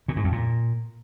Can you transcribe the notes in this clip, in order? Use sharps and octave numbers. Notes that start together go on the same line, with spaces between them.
A#2
G#2
F2
A#2